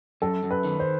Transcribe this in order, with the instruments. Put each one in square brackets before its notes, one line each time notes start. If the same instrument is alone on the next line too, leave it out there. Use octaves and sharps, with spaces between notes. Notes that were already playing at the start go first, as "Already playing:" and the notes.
[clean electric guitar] F#2 [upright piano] A4
[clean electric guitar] F#2
[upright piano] B4
[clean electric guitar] D#3
[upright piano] C5